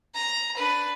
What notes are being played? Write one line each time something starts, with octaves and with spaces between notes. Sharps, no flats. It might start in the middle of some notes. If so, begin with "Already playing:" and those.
A#5
D4 B4